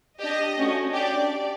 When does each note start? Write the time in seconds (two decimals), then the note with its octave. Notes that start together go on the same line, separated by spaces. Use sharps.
0.19 D4 G4 D#5
0.57 A3 C#4 F#4
0.93 D4 G4 D5